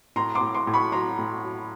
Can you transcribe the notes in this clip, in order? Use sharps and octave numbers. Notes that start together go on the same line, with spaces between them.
A2 A#5 C6
C6 D6
A2
C6 D6
A2
B5 C#6
F#3 A#5 C6
A2
F#3